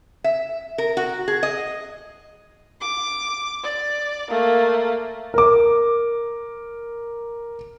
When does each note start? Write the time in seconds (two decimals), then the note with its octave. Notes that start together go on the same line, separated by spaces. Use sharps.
0.24 E5
0.78 A#4
0.97 F#4
1.28 G#4
1.43 D#5
2.81 D6
3.64 D5
4.30 A3 A#3
5.34 A#4 D6